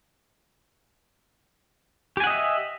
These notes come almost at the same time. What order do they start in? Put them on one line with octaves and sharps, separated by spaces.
G4 G#5 F#5 D#5 E5